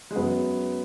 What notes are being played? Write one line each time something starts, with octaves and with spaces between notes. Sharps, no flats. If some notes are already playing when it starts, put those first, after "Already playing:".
G#3
F#2 F#3 B3